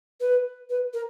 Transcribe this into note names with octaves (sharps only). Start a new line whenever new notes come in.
B4
B4
A#4